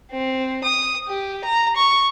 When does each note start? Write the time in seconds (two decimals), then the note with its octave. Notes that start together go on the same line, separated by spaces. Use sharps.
0.12 C4
0.64 D#6
1.08 G4
1.44 A#5
1.76 C#6